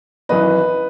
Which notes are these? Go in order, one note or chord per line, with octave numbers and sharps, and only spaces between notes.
G#1 F#2 E3 B4 D#5